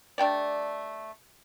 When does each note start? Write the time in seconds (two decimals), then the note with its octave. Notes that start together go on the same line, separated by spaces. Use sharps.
0.18 A3 D4 G4 D5